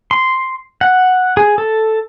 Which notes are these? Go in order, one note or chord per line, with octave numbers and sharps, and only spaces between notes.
C6
F#5
G#4
A4